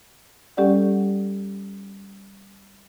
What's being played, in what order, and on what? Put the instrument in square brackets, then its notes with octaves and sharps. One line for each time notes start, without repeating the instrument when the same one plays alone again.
[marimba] G3 C#4 G4 A4 D5 F#5